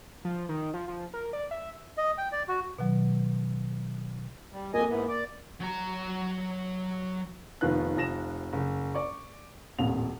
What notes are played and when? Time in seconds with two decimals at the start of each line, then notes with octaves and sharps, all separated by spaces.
0.25 F3
0.49 D#3
0.74 F3
0.88 F3
1.14 A#4
1.33 D5
1.51 E5
1.98 D#5
2.18 G5
2.32 D5
2.49 F#4
2.78 B2 D#3 F#3
4.52 G3
4.74 F2 A#3 D#5 G#5
4.89 G#2 E3 B3
5.08 D5
5.60 F#3 A#5
7.61 F1 D#3 F3 B3 F4 F#6
7.96 F1 F3 A#6 E7
8.53 F#1
8.95 D5 C#6
9.78 D#1 A1 F2 A#2 F7